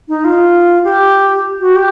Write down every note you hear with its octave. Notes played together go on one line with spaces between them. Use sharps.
D#4
F4
G4
F#4
G4